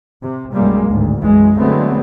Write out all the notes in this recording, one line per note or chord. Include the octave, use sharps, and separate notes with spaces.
C3
B1 F#2 G3 G#3 A#3
G#1 D2 A2
B1 F#2 E3 G#3
D3 F#3 G#3 A3 B3 C4